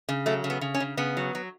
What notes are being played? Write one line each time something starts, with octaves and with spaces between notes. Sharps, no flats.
C#3
F#3 A3
C#3
B3
C#3
C#4
C#3
C#3 B3
F#3
F#3